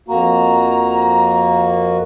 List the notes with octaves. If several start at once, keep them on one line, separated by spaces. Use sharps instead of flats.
F2 A#3 F#4 A#5